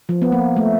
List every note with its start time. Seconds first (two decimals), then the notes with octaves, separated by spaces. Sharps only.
0.09 F3
0.22 B3
0.32 A#3
0.56 A3